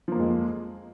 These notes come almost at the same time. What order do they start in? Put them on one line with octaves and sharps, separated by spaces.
F3 A#3 F2 G#3